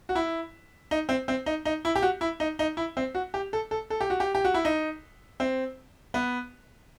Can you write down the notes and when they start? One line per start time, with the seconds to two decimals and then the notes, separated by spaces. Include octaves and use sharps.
0.09 F#4
0.15 E4
0.91 D#4
1.09 C4
1.28 C4
1.46 D#4
1.65 D#4
1.85 E4
1.95 G4
2.02 F#4
2.21 E4
2.40 D#4
2.59 D#4
2.77 E4
2.97 C4
3.15 F#4
3.34 G4
3.53 A4
3.71 A4
3.90 A4
4.01 G4
4.10 F#4
4.20 G4
4.35 G4
4.45 F#4
4.54 E4
4.65 D#4
5.40 C4
6.14 B3